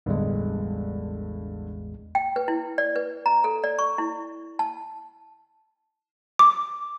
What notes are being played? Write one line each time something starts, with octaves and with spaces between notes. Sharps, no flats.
A1 E2 G2 D3 G3 G#3
G5
B4
E4
D5
B4
A#5
A4
D5
C#6
E4
A5
D6